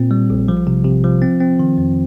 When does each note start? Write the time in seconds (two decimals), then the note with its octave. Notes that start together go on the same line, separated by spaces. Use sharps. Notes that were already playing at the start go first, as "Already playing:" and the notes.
Already playing: A#2 C4
0.11 G3
0.30 A#1
0.48 F3
0.67 C3
0.85 C3
1.04 F3
1.22 C4
1.40 C4
1.59 D#3
1.78 F2